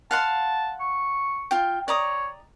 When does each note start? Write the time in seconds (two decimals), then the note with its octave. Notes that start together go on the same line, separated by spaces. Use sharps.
0.11 F5 F#5 A5 C6
0.80 C#6
1.51 F4 G5
1.88 C#5 D5 A#5 D#6